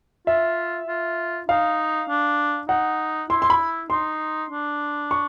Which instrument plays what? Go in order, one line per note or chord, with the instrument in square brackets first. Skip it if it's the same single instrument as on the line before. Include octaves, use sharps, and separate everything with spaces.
[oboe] F4 [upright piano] E5
[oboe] F4
[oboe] D#4 [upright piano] F5
[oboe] D4
[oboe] D#4 [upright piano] F#5
[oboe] E4 [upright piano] C6
[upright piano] C6
B5
[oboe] D#4 [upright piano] C6
[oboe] D4
[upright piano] C#6